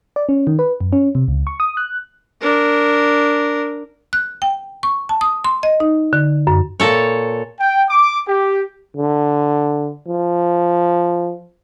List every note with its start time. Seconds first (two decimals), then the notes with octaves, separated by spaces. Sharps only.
0.16 D5
0.29 C#4
0.47 D#3
0.59 B4
0.81 F#2
0.93 C#4
1.15 C3
1.28 C#2
1.47 C#6
1.60 D#6
1.77 F#6
2.41 D4 A#4
4.13 F#6
4.42 G5
4.83 C#6
5.09 A5
5.21 D#6
5.44 C6
5.63 D#5
5.80 D#4
6.13 D3
6.47 F#2
6.80 A#2 A4 C#5
7.60 G5
7.90 D6
8.27 G4
8.96 D3
10.08 F3